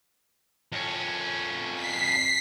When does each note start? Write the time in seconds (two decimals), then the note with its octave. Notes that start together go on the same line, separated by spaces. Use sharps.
0.72 F2 C#4
1.73 B6 C7